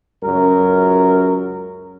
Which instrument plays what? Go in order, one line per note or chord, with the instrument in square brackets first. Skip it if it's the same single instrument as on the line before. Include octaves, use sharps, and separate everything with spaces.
[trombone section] C#2 F#2 A#4